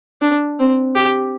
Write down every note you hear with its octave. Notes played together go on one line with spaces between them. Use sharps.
D4
C4
G4